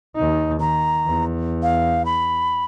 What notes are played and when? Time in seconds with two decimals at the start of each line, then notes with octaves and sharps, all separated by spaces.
0.16 D#2 D#4
0.60 D#3 A#5
1.06 E2
1.63 F5
2.06 B5